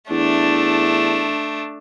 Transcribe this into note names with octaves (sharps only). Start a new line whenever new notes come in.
E2 A3 D4